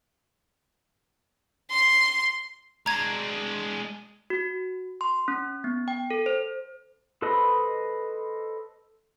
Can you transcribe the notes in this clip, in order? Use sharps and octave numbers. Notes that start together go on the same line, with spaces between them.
C6
G#3 D4 A#5 G#6
F#4
C6
C#4
B3
G5
A4
C5
A4 B4 C5 D#5 B5